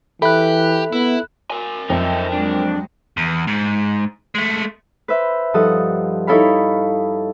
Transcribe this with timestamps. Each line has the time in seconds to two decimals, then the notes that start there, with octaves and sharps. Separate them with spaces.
0.22 E3 G4 A4 E5 B5 F#6
0.92 B3 E4
1.51 A#4 G#5
1.90 F2 F#3 D#4 E5
2.32 F#3 G#3 D4
3.17 E2
3.47 G#2
4.35 G#3 A3
5.08 B4 C5 E5
5.54 G2 F3 D#4 A4 F#5 D#6
6.27 D#4 E4 A4 C#5 F5 B5